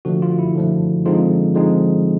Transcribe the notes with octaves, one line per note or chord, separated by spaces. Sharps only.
D3 F3 A3 F#4
F4
E4
D3 F3 A3
D3 F3 G#3 C4 D#4 F4
D3 F3 G#3 C4 D#4